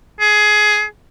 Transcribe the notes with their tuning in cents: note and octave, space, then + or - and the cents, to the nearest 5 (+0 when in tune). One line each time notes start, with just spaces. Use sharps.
G#4 +20